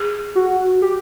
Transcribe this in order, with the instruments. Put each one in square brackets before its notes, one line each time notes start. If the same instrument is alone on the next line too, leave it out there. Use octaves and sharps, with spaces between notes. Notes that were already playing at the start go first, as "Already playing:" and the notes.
Already playing: [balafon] G#4
[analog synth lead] F#4
G4